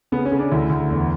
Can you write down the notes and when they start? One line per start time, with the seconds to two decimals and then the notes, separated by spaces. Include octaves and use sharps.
0.12 C#3 B3
0.26 C#4
0.32 C#3
0.39 D4
0.51 D2 E4
0.70 D2
0.91 E2